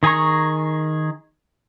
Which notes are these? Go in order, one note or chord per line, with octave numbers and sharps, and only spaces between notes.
D#3 G#4 G#5 A#5 C#6